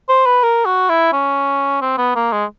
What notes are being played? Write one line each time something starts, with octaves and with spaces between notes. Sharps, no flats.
C5
B4
A#4
F#4
E4
C#4
C4
B3
A#3
G#3